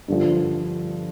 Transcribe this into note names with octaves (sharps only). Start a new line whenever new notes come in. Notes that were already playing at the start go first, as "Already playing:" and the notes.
G2 D3 F3